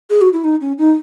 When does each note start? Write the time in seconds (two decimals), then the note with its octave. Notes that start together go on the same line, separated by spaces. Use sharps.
0.10 G#4
0.21 F#4
0.33 E4
0.44 D#4
0.61 C#4
0.78 D#4